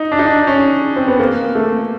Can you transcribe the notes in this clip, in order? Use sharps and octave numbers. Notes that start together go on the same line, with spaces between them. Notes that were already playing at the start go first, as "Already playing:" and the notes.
Already playing: D#4
D4
D#4
D4
C#4
C4
B3
A#3
A3